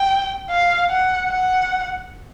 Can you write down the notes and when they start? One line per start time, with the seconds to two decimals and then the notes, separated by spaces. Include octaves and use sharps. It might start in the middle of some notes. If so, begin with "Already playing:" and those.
Already playing: G5
0.50 F5
0.89 F#5
1.29 F#5